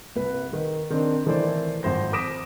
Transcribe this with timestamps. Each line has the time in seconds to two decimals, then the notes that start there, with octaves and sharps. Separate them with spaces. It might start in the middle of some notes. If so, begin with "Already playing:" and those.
0.16 C2 B4
0.53 D#3
0.90 D#3 C4 D4
1.26 D#3 E3 A3 E4 C5 D5
1.83 G#1 F3 C5 A#6
2.13 D6 D#6 A#6 B6 D7 E7